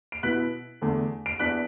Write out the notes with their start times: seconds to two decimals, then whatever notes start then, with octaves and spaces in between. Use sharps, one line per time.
0.12 D7
0.23 B2 B3 E4 F#6 B6
0.81 E2 D3 A3
1.26 D7
1.39 E2 E3 D4 F#6 B6